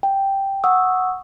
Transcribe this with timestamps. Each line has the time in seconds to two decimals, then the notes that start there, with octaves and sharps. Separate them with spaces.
0.03 G5
0.64 F#5 C#6 D#6 E6